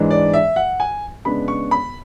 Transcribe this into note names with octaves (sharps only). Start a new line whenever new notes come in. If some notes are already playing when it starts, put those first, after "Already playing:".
Already playing: G#2 E3 G#3 D4
D5
E5
F#5
G#5
C#3 G#3 B3 D4 B5
C#6
B5